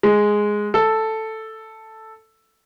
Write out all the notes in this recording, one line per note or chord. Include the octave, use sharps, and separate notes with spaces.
G#3
A4